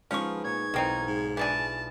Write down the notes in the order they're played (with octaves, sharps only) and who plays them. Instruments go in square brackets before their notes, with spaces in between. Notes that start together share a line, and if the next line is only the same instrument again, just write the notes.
[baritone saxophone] F3 [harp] G#3 B3 D#4 [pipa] C#4 C#6
[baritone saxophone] A#2 [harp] C#5 [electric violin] G#6
[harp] B1 F5 [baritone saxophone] E2 [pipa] D#3 C4 D#4
[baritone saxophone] G#2
[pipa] E3 D4 G#4 [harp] F4 D7 [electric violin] A5